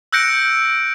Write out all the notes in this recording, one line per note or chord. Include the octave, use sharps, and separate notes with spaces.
E6 F#6 G6 A#6 C#7 D7